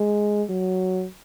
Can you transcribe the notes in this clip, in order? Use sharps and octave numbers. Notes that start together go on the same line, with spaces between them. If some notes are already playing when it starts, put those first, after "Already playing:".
Already playing: G#3
F#3